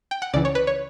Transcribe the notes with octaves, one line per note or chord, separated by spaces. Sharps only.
G5
F#5
C#2 C#3 E3 D5
C#5
B4
C#5